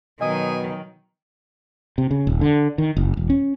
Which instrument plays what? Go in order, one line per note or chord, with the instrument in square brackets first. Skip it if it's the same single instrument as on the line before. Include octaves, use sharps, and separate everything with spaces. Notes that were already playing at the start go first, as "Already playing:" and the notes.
[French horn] B2 [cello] D#3 F#3 [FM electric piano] D#5 D#6 [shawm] G#5
[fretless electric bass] C3
C#3
D#1
D3
D#3
F#1
E1
C#4